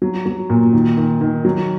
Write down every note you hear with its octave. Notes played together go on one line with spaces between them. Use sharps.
F#3
F#3
A#2
D#3
D#3
D#3
F#3